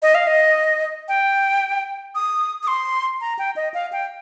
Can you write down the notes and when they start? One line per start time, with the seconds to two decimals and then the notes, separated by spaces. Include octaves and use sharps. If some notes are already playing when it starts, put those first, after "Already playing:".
0.02 D#5
0.15 F5
0.27 D#5
1.08 G5
2.15 D#6
2.63 D#6
2.68 C6
3.21 A#5
3.39 G5
3.56 D#5
3.74 F5
3.92 G5